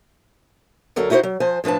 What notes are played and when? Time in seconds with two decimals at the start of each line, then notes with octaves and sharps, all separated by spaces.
0.96 D2 F#3 A4 A#4
1.10 D#4 E4 F#4 B4 C5
1.23 F#3
1.40 F3 C5 G#5
1.64 A2 F3 D4 B4 A5